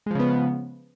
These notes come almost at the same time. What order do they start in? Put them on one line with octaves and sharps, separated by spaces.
G#3 F3 C#3 B3